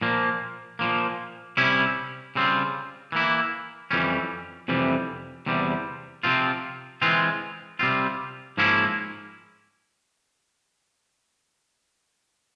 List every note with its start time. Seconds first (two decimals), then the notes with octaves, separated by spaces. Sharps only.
0.01 A#2 F3 A#3
0.79 A#2 F3 A#3
1.57 C3 G3 C#4 E4
2.35 C#3 G3 C4 F4
3.12 E3 A#3 E4
3.91 F2 E3 G3 C#4
4.68 F2 C3 E3 G3
5.46 E2 C3 G3
6.23 C3 F3 C4 F4
7.02 E3 G#3 C4 F4
7.79 C3 G3 C4 F4
8.57 G#2 F3 A#3 C#4 E4